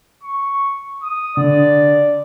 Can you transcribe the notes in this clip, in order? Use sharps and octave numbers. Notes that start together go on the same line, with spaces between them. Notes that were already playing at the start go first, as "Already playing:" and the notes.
C#6
D#6
D3 D5